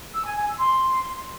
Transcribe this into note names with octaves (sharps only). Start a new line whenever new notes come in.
E6
G#5
G#5
E6
C6